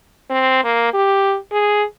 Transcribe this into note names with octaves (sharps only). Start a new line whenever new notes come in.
C4
A#3
G4
G#4